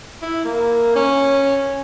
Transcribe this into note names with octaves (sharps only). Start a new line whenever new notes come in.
E4
A#3
C#4